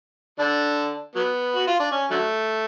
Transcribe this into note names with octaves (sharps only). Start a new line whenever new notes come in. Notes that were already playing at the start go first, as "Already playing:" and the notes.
D3 D4
F#3 B3
F#4
F4
D4
C#4
D3 F#3 A3